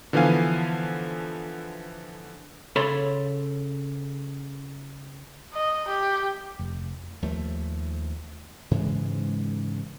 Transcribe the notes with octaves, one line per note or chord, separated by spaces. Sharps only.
D3 E3 F3 B3 F5 G#5
C#3 A4 C#5 D5 B5 C6
D#5
G4
F1
D#2 F3 A3
G#2 C#3 E3 G#3